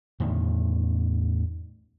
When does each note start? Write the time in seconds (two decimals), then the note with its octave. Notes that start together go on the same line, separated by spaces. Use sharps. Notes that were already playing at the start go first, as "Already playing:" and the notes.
0.20 E2 A2 D3 D#3